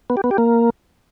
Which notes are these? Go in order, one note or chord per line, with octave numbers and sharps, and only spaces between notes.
B3
G4
B3
G4
A#3